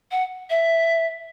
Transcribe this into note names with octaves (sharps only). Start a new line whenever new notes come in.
F#5
E5